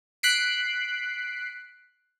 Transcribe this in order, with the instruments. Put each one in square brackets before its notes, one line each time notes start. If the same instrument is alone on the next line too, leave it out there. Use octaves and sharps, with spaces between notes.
[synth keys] F#6 B6 C7 D7